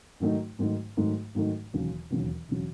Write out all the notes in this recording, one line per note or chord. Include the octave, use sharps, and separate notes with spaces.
G#2 D#3 F#3 A3 D#4
G#2 D#3 F#3 A3 D#4
G#2 D#3 F#3 A3 D#4
G#2 D#3 F#3 A3 D#4
E1 D#2 C#3 F#3
E1 D#2 C#3 F#3
E1 C#3 F#3